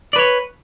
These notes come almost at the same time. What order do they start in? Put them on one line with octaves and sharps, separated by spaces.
D5 B4 C#5